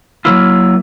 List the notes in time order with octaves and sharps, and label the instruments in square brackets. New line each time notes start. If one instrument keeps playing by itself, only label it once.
[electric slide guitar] F#3 A#3 E4 F4